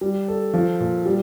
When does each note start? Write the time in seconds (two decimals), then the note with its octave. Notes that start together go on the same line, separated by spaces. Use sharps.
0.01 G3
0.28 A4
0.54 F3
0.80 A#2
1.06 G3